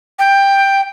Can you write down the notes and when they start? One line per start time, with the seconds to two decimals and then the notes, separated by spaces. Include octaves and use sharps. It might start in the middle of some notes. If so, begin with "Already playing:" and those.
0.19 G5